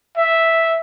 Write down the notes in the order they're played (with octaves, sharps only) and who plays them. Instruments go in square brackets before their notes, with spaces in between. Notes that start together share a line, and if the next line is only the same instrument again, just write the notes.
[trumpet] E5